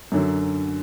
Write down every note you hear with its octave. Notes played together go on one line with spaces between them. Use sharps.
F#2 D3 F#3